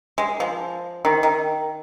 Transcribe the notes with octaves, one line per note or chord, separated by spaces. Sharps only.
G#3
F3
D#3
D#3